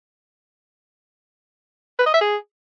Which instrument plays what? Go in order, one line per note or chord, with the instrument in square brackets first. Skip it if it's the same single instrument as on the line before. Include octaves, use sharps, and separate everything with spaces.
[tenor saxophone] B4
D#5
E5
G#4